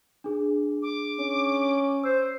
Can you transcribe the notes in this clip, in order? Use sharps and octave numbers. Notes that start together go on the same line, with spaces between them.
D4 G#4
D6
C#4
C5 E6